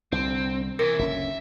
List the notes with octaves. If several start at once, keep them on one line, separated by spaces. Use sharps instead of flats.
C2 D3 C4
C3 E3 A#4
F#1 D2 C#4 E5